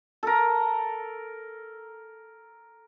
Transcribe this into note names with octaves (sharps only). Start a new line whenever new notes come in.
A4 A#4